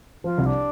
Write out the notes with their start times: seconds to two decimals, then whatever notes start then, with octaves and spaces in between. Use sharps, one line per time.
0.24 F3 F4
0.38 C2
0.46 D4